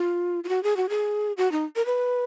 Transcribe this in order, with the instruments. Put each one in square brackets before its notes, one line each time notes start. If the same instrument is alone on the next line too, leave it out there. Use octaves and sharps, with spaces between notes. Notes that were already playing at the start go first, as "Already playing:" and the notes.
Already playing: [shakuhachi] F4
F4
F#4
G#4
F#4
G#4
F#4
D#4
A#4
B4